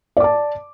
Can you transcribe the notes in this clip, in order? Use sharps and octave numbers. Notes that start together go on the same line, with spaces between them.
D5 A5 D6